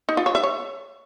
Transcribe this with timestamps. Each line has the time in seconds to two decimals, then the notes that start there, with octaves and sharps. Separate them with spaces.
0.09 D#4
0.17 F4
0.26 C#5
0.35 E5
0.43 C#5